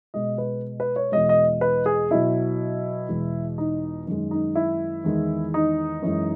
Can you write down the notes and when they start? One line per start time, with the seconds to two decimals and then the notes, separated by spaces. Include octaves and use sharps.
0.14 B2 G#3 D#5
0.38 B4
0.80 B4
0.96 C#5
1.12 E2 B2 G#3 D#5
1.29 D#5
1.61 B4
1.86 G#4
2.11 B2 F#3 E4
3.09 E2 B2 G#3
3.58 D#4
4.07 F#2 D#3 G#3
4.31 D#4
4.55 E4
5.04 E2 D#3 G#3
5.54 D#4
6.02 F#2 E3 G#3